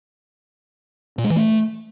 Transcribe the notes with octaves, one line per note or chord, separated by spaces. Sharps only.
A#2
G#3
E3
A3